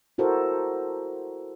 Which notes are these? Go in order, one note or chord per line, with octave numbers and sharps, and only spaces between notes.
E4 F#4 A4 A#4 C5